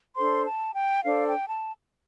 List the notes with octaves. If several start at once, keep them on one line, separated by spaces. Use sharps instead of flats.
D4 A4 C5 C6
A5
G5
D4 A4 C5 F5
G5
A5